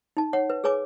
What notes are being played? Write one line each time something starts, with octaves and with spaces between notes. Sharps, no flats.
D#4 A5
C#5 F#5
B4
G#4 B4 C#5 G#5 D6